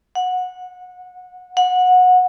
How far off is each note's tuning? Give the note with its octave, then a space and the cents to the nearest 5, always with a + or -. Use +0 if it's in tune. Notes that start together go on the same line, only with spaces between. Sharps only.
F#5 -15
F#5 -20